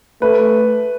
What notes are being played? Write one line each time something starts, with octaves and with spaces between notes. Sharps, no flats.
A3 B4